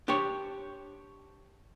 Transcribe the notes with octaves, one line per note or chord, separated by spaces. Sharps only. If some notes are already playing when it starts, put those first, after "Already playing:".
D4 G4 C5 C#5